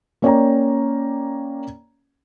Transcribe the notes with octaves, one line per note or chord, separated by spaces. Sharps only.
A#3 C#4 C#5 D5 G5 A#5